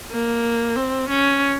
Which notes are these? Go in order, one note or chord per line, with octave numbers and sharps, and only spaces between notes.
A#3
C4
C#4